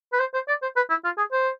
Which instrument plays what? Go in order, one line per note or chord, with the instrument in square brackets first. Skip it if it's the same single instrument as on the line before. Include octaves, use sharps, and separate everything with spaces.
[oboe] B4
C5
C5
D5
C5
B4
E4
F4
G#4
C5